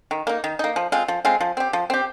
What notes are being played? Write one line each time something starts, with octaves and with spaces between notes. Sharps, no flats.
D#3
A#3 D#4
D#3
A#3 D#4
F3
G#3 C4 F4
F3
G#3 C4 F4
F3
C4 G4
F3
C4 G4